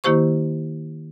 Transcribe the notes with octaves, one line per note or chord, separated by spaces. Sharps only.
D#3 A#3 E4 G4 C5 C#6